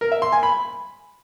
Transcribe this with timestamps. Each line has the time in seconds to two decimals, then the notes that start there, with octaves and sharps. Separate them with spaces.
0.01 A#4
0.12 E5
0.22 C6
0.32 G#5
0.43 B5